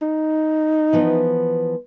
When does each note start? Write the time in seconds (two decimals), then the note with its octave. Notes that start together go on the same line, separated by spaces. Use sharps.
0.02 D#4
0.93 E3 F3 B3